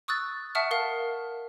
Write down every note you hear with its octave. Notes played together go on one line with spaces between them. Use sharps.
C#6 D#6 E6 F#6 A6
E5 F#5 A5 C#6 D#6 F6
A#4 F5